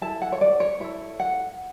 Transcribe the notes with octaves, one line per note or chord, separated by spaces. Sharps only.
E4 A4 A5
F#5
C#5
D5
C#5
E4 A4 C#5
F#5